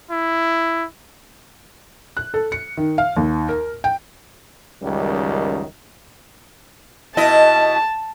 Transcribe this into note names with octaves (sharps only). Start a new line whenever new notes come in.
E4
F#6
A4
C#7
D#3
F5
D#2
A#4
G5
C#2 F#2 D#3 G3
B2 E4 D#5 A5